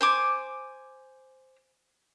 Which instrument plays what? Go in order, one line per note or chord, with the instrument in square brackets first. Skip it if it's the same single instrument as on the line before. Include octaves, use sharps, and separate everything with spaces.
[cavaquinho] C5 G#5 D6